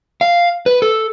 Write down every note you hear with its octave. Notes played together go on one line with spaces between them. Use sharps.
F5
B4
A4